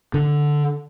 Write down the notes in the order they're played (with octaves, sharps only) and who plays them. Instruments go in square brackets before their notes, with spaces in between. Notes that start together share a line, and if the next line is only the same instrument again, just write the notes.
[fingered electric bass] D3